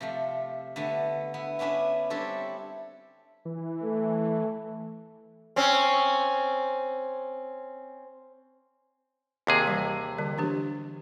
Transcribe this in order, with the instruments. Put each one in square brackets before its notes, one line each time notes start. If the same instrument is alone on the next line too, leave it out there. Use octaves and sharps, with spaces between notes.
[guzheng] C3 F3 A3
D3 A3 B3
B3 E4
B3 C#4 D4 E4 E5
G3 C4 D4 E4 A4 C#5
[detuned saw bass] E3
[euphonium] A3
[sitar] C4 C#4
[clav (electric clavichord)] D#2 C3 G#4
[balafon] E3 G3
D3 G3
E3 D4 G4